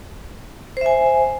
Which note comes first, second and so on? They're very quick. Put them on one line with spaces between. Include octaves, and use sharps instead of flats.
C5 E5 G#5